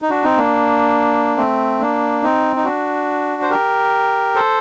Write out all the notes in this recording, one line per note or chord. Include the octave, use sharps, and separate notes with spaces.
D#4
D4 F#4
C4 D#4
A#3 D4
A3 C4
A#3 D4
C4 D#4
D#4
D4 F#4
C5
G4 A#4
A4 C5